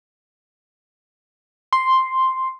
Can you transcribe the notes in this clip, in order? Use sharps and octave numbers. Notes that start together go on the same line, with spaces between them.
C6